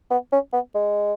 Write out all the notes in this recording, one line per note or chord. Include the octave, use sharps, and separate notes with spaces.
B3
C#4
B3
G#3